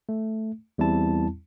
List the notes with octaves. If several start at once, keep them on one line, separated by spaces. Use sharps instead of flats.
A3
E2 G3 C4 E4 A5